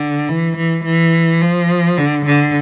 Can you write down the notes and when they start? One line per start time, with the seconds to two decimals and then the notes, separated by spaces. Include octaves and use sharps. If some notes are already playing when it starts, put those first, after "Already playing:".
Already playing: D3
0.29 E3
0.57 E3
0.85 E3
1.42 F3
1.97 D3
2.26 D3